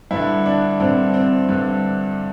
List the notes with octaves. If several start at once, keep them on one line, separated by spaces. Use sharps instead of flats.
G2 D3 E4
D4
G2 D3 C4
C4
G2 D3